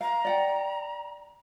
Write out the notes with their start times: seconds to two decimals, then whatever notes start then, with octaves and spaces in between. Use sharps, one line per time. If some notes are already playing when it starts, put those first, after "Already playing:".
0.01 F5 A#5
0.25 D5 F#5 G5